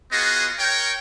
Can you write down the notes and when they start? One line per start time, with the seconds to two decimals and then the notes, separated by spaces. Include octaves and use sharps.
0.12 B3 F4 F#4 G#4 D#5
0.58 A#4 C#5 G5